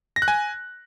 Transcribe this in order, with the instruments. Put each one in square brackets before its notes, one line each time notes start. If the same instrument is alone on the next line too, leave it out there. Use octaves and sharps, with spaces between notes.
[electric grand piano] A#6
F#6
G#5